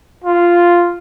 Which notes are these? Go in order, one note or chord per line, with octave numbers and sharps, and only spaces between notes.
F4